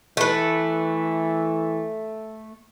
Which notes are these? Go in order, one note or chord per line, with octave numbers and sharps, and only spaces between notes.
E3 A3 B4